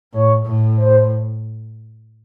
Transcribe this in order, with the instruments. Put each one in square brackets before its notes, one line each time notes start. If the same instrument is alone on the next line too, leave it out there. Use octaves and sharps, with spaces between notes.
[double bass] A2 [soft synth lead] C#5
[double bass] A2
[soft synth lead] C5